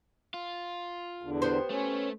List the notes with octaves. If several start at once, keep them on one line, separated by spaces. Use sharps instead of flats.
F4
E2 D3
B3 G4 C5
A3 C#4